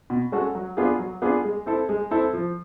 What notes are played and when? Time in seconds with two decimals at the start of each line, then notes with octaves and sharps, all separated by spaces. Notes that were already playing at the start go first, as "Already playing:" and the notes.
0.10 B2
0.32 G#3 C#4 F#4 A4
0.55 F#3
0.77 B3 D4 F4 G#4
0.99 F#3
1.22 B3 D4 F4 G#4
1.45 G#3
1.66 C4 E4 A4
1.89 G#3
2.11 C4 E4 A4
2.33 F3